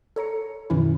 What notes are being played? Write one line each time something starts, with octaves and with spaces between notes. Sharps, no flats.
A4 C#5 A#5 C#7
F#2 B2 D#3 E3 C#4 E4